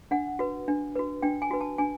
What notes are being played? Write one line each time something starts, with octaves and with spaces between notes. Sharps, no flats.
D4 F#5
F#4 B4
D4
F#4 B4
D4 G5
G#5
F#4 B4
A5
D4 G#5